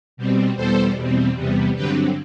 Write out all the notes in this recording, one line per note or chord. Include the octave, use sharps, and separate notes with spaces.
B2 G3 C4
E2 B2 G3 A4 C5
E2 B2 G3 C4
E2 C3 G3 B3
G2 D3 F#3 C4 G4 B4